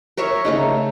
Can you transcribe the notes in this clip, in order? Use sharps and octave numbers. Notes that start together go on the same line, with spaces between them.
A#4 C#5 E5 C#6
C#3 A3 D#4